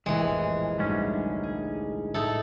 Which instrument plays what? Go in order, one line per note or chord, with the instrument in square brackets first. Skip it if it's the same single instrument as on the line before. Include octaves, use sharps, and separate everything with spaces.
[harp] F1 A#1 [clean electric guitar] A2 [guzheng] E3 G#3
[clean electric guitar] D2 G#2 C#4 [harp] G3 D4 E4
[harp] G#4
[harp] A2 [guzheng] D#4 E4 A4